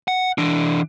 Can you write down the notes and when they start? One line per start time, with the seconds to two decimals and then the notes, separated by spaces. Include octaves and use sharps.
0.08 F#5
0.38 E3 D4